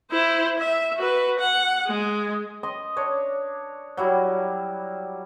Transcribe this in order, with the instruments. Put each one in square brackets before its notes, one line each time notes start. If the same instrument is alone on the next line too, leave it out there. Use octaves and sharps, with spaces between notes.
[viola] E4 C5
E5
F#4 B4
F#5
G#3
[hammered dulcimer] D#5 C6
D4 C#5
F#3 G3 E4